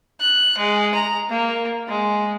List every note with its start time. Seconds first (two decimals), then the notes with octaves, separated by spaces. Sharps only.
0.20 F#6
0.57 G#3
0.94 A#5
1.29 A#3
1.88 G#3